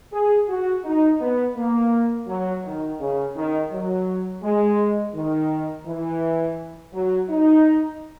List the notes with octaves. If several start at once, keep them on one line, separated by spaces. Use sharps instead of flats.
G#4
F#4
D#4
B3
A#3
F#3
D#3
C#3
D#3
F#3
G#3
D#3
E3
F#3
D#4